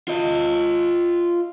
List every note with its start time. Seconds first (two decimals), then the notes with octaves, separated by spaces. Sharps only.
0.08 F4 D#5